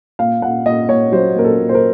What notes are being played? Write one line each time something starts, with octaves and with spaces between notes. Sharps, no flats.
A#2 F5
A#2 F#5
A#2 D#5
A#2 C#5
F#3 C5
A#2 A#4
A4
A#2
C5
A#4